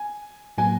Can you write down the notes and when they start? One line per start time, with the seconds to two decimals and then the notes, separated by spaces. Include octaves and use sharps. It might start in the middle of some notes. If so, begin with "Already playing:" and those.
Already playing: G#5
0.58 A2 F#3 A#3 G#5